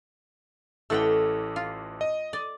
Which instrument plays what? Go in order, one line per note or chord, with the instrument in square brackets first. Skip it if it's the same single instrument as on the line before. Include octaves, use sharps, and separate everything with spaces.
[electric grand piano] A1 E3 E6 [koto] A3 F#5 G5
[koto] F4
[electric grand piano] D#5
[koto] D5